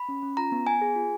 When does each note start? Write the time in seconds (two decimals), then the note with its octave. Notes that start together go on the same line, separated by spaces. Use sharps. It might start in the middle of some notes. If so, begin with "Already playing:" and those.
Already playing: B5
0.09 C#4
0.23 C#4
0.37 F4 A#5
0.52 B3
0.67 B3 G#5
0.82 G#4
0.96 F4